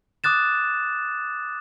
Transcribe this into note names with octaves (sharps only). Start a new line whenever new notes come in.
D6 D#6 F#6 A6 E7